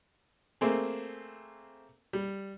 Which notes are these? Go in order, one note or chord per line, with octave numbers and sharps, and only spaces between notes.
A3 A#3 C4 G#4
G3